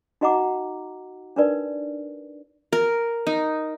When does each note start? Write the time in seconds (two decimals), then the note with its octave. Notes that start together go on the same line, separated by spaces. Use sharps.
0.21 D#4 F#4 D#5 F#5 A#5 D6
1.36 D4 D#4 A#4 B4 D5
2.73 A#4
3.27 D#4